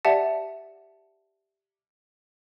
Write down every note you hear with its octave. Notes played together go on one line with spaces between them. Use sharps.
G4 D5 E5 F#5 A5